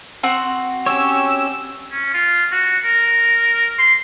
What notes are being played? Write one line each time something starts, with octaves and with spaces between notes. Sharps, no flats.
C4 F#4
C#4 G4 C#5 E6
C#4
F4
F#4
A#4
C6